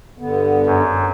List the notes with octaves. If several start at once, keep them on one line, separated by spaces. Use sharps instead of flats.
G2 D3 B3
F#2